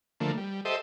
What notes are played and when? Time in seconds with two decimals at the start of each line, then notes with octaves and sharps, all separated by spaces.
0.20 D3 F3 A3 A#3
0.37 G3
0.65 G4 A4 C5 D#5 E5